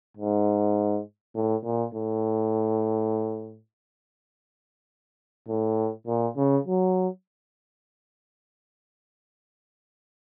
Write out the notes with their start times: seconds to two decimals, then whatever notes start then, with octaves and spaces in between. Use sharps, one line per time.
0.17 G#2
1.35 A2
1.65 A#2
1.94 A2
5.48 A2
6.07 A#2
6.37 C#3
6.67 F#3